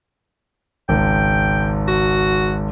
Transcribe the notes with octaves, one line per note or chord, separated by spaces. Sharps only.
G#1 C#2 G5
F#4